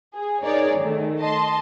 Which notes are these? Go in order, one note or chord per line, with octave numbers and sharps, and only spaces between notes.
G#4
D#4 G#4 A#4 C#5 D5
D#3 A3
D#5 A5 C6